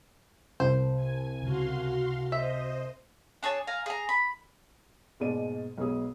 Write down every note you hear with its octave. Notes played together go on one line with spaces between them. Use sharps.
C2 C5
G#5
C#2 C#3 F#4 F5 C6
C5 D#5 E5
D4 G#4 C#5 A5
F5 G#5 A#5
G#4 A#5
B5
G#2 B2 G#3 A#3 D5 D#7
B1 G#3 B3 G#4 D#6